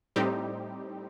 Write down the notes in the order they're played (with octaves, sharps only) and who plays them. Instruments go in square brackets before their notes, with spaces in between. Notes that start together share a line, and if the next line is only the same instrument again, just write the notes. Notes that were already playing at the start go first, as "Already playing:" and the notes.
[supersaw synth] A2 G3 C4 D#4 G4